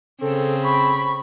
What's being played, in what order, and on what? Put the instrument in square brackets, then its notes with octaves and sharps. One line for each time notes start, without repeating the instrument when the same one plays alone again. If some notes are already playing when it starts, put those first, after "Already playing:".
[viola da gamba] C#3 [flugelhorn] C4 [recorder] A4
[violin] B5 [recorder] C#6